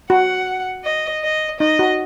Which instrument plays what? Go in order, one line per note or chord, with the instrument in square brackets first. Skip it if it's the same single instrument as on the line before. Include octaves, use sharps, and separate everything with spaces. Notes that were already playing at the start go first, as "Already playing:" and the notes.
[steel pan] F#4 [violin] F#5
[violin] D#5
D#5
[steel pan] D#4 [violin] D#5
[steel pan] F#4